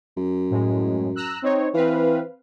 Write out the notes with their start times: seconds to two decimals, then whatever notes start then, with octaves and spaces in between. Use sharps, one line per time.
0.17 F#2
0.50 A2 G#3
1.16 A#5 E6 F#6
1.42 C4 D#4 C#5
1.74 E3 C4 B4 F5